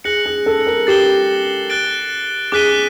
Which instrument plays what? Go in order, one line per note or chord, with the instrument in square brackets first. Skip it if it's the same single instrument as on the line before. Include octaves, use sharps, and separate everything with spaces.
[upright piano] G#4 [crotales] F#6 A#6 C#7 F#7
[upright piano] G#4
A4
A#4
[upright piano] G4 [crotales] A6 C7 E7 G7
[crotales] F#6 A6 D7 G7
[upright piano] G#4 [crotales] D6 F#6 B6 D#7 G7